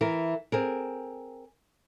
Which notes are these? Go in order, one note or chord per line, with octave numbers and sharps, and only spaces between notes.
E3 A#4
C4 G#4 A#4